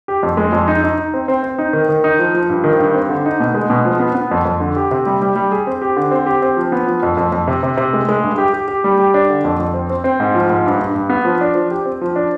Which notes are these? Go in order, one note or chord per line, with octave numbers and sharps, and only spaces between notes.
G4
F2
G#3
F2
D#4
D#4
D#4
C4
C4
C4
D#4
D#3
D#3
D#4
F3
F3
G2
D#3
G2
C4
D3
D#4
B2
G#3
B2
F3
B3
B3
F2
F2
D3
G4
C3
G3
G3
G3
G#4
C4
G4
D3
C4
G4
C4
F3
B3
F3
F2
F2
F2
C3
C3
C3
G#3
G#3
G2
G4
G4
G4
G3
G4
D4
D3
F2
F2
C4
C4
C4
G#2
F3
G#2
G2
G2
G2
B3
F3
D4
F3
G4
C4
F3
D4